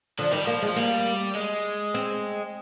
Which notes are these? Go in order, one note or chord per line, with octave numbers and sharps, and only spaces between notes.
D3 F3
D#3 G3
F3 A#3
G#3
F3
G3 A#3
G#3
C4